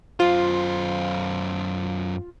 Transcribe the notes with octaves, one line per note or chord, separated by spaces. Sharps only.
F#2 F4 C5